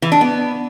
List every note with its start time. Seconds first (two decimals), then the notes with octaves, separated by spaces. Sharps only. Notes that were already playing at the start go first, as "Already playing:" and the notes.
0.02 E3
0.12 D4
0.21 B3